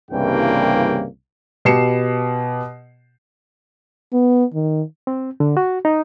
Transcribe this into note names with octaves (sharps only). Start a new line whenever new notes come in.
C2 G2 C#3 E3 A#3 G5
B2 G4 C7 C#7 E7
B3
D#3
C4
D3
F#4
D#4